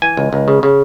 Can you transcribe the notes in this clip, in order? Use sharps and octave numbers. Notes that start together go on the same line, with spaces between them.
E3 G#5
C#2
C#2
C#3
C#3